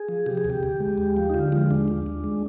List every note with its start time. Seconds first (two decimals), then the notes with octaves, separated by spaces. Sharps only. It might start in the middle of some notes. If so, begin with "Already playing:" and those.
Already playing: G#4
0.09 F3
0.26 C3 G4
0.37 G#4
0.44 D2
0.50 G4
0.63 D2
0.80 G#3
0.98 D#2
1.17 F3
1.30 D#4
1.34 D3 F4
1.52 G#3 F4
1.70 D#2 D4
1.88 D#2
2.06 D#2
2.24 G#3